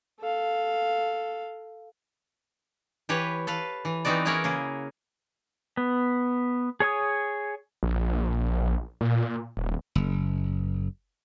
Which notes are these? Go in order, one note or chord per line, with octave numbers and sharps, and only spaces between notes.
A4 F5
E3 G4 B4 C#5
A4 B4 F5
E3
E3 B3 C4 D#4 F#4 D5
C#4 E4 G#4 A#4 C#5 D5
C#3 A#3 G#4
B3
G#4 C#5 G#5 D#6
A#1
A#2
D#1
F#1